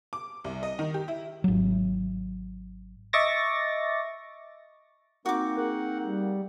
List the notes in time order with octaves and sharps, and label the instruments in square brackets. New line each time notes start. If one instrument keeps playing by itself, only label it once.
[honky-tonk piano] D6
C2
D#5
D#3
G4
E4
[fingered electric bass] G#1 F#3
[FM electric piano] D#5 E5 C#6 D6 A6 A#6
[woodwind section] A#3 C4 D#4 [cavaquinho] F#4 D6
[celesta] G#4 A#4 [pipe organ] F#5
[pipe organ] G3